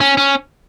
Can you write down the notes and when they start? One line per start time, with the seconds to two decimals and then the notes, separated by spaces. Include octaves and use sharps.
0.01 C#4
0.17 C#4